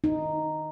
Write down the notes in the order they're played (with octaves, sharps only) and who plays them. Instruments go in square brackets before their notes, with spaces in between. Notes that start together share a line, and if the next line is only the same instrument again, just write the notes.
[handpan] D#4